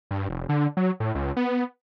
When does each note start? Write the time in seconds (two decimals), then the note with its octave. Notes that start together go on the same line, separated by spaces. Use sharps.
0.11 G2
0.29 F1
0.49 D3
0.77 F#3
1.00 A2
1.15 C#2
1.37 B3